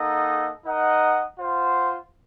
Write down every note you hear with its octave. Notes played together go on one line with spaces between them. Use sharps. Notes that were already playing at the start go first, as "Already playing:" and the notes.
Already playing: A#3 D#4 A4 D#5 F#5
D#4 A#4 D#5 F#5
F4 C5 F#5